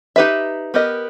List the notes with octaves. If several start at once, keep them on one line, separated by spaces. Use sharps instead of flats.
D#4 G4 B4 E5
B3 G4 A#4 D#5